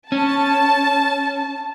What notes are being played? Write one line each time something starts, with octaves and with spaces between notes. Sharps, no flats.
C#4 A5